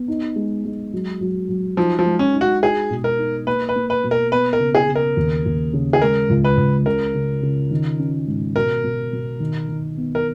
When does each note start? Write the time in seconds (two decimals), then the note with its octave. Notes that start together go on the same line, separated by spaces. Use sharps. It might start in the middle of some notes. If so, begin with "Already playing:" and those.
Already playing: B3
0.08 D#4
0.36 G#3
0.65 G#3
0.93 F#3
1.21 F#3
1.49 F#3
1.77 F3 D#4
1.99 F3
2.05 G#3
2.19 C#4
2.33 D#4
2.41 F#4
2.62 F#4 G#4
2.90 B2
3.04 A#4
3.18 D#4
3.47 A#3 B4
3.69 B4
3.76 A#3
3.90 B4
4.04 B2
4.11 A#4
4.32 B3 B4
4.53 A#4
4.60 C#3
4.75 G#4
4.88 C#3
4.95 A#4
5.17 D#2
5.46 D#2
5.73 C#3
5.93 G#4
6.01 G#3 A#4
6.29 C#2
6.44 B4
6.57 C#2
6.86 C#3 A#4
7.15 C#3
7.42 C#3
7.71 D#3
7.99 C#4
8.27 G#2
8.56 B2 A#4
8.84 B2
9.13 B2
9.40 D#3
9.69 D#3
9.97 B3
10.15 A#4